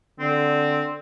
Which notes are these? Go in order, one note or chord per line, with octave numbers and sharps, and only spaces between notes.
D3 C4